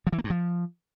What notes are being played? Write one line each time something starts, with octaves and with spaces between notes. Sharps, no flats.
F3
E3
A#3
G2
F3